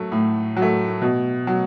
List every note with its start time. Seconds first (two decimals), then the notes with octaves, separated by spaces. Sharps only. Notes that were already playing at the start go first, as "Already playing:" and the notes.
Already playing: F#3 A3
0.12 A2
0.57 F#3
0.62 A3
1.02 B2
1.47 F#3